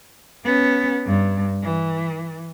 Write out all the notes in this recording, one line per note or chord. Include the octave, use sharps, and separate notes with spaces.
B3 C#4
G2
E3